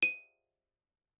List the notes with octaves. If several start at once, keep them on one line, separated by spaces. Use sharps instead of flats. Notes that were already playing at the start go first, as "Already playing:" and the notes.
D#7